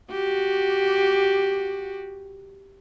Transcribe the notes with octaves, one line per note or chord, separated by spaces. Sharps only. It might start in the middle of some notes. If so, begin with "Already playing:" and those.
F#4 G4